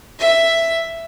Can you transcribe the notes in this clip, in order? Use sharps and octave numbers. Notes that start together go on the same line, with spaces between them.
E5